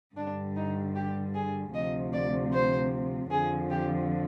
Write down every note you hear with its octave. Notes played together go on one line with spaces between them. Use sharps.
G2 D3 G3 D4
D#4
G4
G#4
D2 C3 F3 D#5
D5
C5
F2 D3 F3 G#4
G4